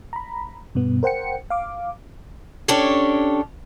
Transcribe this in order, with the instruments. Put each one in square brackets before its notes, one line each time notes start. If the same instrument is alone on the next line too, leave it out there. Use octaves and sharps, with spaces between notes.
[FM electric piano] A#5 B5
G2 B2 B3
A#4 C5 F#5 G5 C#7
F5 D6
[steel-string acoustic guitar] C#4 D4 G4 A4 C#5